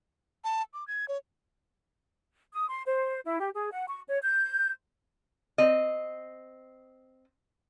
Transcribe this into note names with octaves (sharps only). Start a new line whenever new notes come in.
A5
D6
G#6
C#5
D#6
C6
C5
E4
G4
G#4
F#5
C#6
C#5
G6
C4 D#5